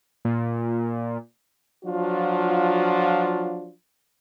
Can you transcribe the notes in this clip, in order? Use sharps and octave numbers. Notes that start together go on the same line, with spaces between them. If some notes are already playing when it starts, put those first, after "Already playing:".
A#2
F3 F#3 D4 F4 F#4